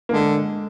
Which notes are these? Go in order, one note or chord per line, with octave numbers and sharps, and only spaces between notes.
A#3
D3 G#3